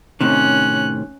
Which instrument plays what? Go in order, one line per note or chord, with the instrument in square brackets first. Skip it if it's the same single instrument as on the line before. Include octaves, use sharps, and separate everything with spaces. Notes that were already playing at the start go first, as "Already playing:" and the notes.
[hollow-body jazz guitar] A2 C3 D#3 [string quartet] C#4 F#6